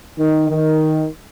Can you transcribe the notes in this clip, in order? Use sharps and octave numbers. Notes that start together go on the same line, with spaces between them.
D#3
D#3